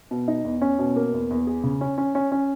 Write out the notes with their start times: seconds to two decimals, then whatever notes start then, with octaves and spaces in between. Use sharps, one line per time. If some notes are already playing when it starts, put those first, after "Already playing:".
0.11 B2
0.28 D#4
0.45 E2
0.62 C#4
0.79 B2
0.96 A#3
1.13 E2
1.30 E2
1.47 G#4
1.63 C#3
1.81 C#4
1.98 C#4
2.15 C#4
2.32 C#4